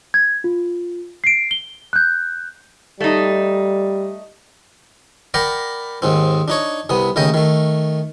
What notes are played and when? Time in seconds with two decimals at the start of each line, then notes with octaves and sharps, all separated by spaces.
0.14 G#6
0.44 F4
1.24 C7 D7
1.51 G7
1.93 F#6 G6
3.01 G3 A3 D#4
5.34 A#4 D5 F#5 G5 A#5 B5
6.02 D#2 G#2 C4
6.48 D4 D#4 C#5
6.89 C2 C3 B3 D#6
7.16 D#2 C#3 A3 D#5 G5
7.34 D#3 A3